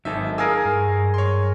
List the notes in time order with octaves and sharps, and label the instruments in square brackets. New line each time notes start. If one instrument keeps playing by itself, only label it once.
[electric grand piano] G#1 E5 [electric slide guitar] F#3 D#4 A4
[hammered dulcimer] G#4 A#4 [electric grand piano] F5 G#5 E6
[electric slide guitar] G2
[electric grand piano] C#5 C6